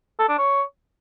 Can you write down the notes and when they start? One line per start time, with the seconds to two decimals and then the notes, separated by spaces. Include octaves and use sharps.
0.19 A4
0.29 D4
0.38 C#5